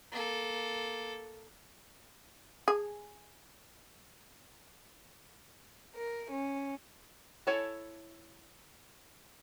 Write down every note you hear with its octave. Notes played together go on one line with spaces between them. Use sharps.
A#3 A4
G#4
A#4
C#4
E4 A4 C#5 G#5 A5